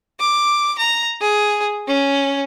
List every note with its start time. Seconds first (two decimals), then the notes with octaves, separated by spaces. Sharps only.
0.20 D6
0.78 A#5
1.21 G#4
1.87 C#4